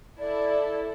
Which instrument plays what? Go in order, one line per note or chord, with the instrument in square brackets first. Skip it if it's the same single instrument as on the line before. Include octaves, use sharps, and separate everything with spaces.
[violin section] E4 A4 [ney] D5